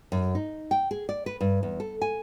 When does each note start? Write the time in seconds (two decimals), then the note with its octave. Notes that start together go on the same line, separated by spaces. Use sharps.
0.12 F#2
0.35 D#4
0.71 G5
0.91 G#4
1.09 D5
1.26 B4
1.41 G2
1.63 E2
1.80 A4
2.02 G#5